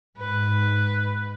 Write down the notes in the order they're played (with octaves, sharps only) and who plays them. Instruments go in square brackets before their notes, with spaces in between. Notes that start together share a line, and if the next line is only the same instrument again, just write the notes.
[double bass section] G#2 [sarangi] B4